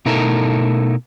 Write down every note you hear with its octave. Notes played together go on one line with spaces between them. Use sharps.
B2 A3 D#4 E4 A4 A#4